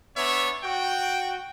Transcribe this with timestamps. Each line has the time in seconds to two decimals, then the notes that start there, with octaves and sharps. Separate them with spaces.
0.17 B3 D4 C#5 E5
0.64 F#4 G5